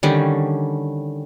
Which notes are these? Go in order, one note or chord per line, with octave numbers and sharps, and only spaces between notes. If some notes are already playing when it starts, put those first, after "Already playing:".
D3 D#3 G3 C#4